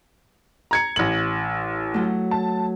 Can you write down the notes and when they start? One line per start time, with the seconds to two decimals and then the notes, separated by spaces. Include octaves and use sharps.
0.71 A#5 G#6 C#7
0.96 A1 F#7
1.94 F#3 A3
2.31 A5